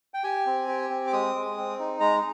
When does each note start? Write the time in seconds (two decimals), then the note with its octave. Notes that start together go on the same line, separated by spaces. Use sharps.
0.14 G5
0.24 G4 G#5
0.46 C4
0.68 G4
0.90 C4
1.07 D6
1.13 G#3 D#6
1.35 G#3
1.57 C4
1.79 D#4
2.00 G#3 A#5